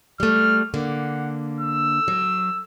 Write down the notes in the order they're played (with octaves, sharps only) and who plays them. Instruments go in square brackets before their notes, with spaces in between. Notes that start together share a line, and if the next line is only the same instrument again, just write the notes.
[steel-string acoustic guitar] G3 A3 [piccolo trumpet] F6
[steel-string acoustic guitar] D3 A#3 [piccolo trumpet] F#5
[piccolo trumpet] E6
[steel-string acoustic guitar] F#3